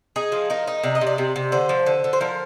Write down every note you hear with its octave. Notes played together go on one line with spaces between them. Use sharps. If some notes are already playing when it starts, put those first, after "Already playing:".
D#4 G#4
F3
D#4 A#4
D#4
C3 D5
D#5
C3
D5
C3
C3
D3 C5
F3
D3
D3
C5
F3 A#4